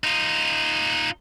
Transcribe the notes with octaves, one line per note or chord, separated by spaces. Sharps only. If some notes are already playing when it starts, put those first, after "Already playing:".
D#4 F4